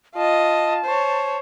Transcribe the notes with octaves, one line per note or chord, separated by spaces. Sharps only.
F4 D#5 A5
C5 C#5